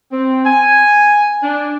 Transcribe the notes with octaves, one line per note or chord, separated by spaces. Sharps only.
C4
G#5
D4